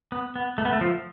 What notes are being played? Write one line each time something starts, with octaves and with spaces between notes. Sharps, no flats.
B3
B3
A3
B3
A3
F3